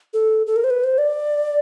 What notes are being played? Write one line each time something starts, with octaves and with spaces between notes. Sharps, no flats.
A4
A4
A#4
C5
B4
C5
D5